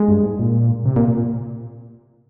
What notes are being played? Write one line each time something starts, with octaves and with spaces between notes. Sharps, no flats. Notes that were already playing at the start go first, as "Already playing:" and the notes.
Already playing: G#3
G2
G#2
A#2
C3
A#2
A#2